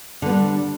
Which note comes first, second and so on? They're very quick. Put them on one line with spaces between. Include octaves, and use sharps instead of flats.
D3 B3 G3 D4